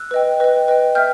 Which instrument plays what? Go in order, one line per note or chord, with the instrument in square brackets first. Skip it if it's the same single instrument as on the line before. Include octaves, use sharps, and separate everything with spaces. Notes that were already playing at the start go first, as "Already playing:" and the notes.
Already playing: [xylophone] E6 F#6
B4 D#5 G5
B4 D#5 G5
B4 D#5 G5
E5 G5 F6 G6